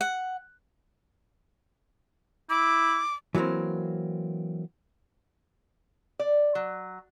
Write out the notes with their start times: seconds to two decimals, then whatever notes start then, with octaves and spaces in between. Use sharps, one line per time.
0.01 F#5
2.50 E4 D6
3.35 E3 F#3 G3 A#3 C4
6.19 D5
6.55 F#3